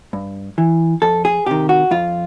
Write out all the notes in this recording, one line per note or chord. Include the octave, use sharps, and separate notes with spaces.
G2
E3
F2 A4
G#4
C3 D#3 G4
F#4
F2 F4